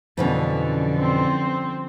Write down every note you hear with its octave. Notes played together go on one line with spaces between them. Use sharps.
F2 B2 D3 E3 F3 G3 C#4
C4